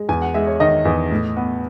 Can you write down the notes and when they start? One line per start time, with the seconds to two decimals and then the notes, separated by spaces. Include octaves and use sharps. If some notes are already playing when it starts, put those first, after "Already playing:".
Already playing: G#3
0.09 E2 G#5
0.22 F#5
0.34 G#3 E5
0.47 C#5
0.60 D#3 D#5
0.85 E2
1.11 A2
1.37 B3